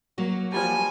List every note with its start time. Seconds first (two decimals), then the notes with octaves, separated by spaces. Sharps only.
0.18 F#3 A#3 F#4
0.54 F3 G3 G#5